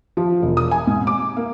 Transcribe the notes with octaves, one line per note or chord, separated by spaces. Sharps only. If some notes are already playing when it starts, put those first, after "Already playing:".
F3
E1
D#6
G#5
G#2
D6
A#3